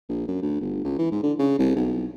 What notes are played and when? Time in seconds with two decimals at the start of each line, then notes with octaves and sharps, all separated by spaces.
0.09 A#1
0.28 F#2
0.42 D2
0.61 G1
0.84 C#2
0.98 E3
1.12 G#2
1.23 D3
1.39 C#3
1.59 C2
1.76 B1